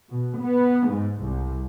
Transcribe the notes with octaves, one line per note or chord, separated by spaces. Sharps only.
B2
B3
G#2
C2